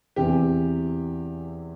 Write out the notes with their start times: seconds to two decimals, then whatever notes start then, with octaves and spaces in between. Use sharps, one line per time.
0.16 E2 C3 E3 G4